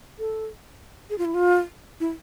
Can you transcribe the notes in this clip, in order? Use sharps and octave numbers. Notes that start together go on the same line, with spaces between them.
A4
G#4
F4
E4
F4
E4